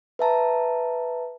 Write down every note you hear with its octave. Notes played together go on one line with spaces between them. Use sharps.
B4 E5 A5 A#5